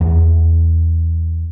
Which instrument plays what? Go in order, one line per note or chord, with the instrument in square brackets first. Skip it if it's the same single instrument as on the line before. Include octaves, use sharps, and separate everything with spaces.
[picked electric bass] E2